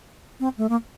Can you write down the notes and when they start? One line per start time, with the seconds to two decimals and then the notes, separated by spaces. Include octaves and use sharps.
0.40 C4
0.58 A3
0.69 A#3